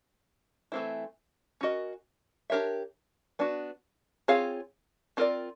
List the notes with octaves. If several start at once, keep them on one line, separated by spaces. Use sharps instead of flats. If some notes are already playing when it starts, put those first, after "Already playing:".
E3 A3 C4 E4
C#4 F#4 A#4 D#5
D4 G4 A#4 C#5 E5
B3 D4 F#4
C4 F4 G#4 C#5 F5
C4 F4 A#4 D5